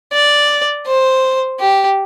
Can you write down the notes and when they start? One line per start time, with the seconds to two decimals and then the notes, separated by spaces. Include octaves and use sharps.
0.12 D5
0.87 C5
1.60 G4